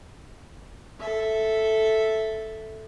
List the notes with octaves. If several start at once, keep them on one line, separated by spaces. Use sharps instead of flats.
A4 E5